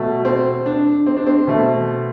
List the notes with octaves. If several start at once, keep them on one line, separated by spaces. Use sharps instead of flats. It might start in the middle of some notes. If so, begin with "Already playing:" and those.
Already playing: B2 F#3 A3
C4
D4
C4
D4
C4
B2 A3